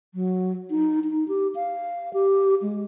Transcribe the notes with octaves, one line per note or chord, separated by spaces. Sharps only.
F#3
D#4
D#4
G4
F5
G4
G#3